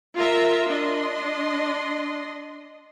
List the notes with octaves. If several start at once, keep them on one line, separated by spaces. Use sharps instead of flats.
F4 A#4 E5 A#5
D4 D#5 C6